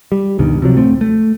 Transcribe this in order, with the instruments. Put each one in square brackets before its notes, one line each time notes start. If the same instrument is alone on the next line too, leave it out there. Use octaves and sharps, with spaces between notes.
[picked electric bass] G3
C#2 G2 B2 D#3
C3 F3 F#3
D1 A3 C4
A3